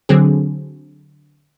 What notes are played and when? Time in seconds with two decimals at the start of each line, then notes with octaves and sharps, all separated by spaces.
0.09 D3 F#3 C4 G#4